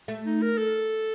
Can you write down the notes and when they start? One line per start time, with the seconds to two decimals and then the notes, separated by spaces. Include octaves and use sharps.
0.08 A3
0.26 D#4
0.42 A#4
0.58 A4